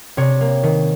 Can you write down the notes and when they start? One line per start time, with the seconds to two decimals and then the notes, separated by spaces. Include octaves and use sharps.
0.17 C3 C#5
0.41 A#3
0.63 D#3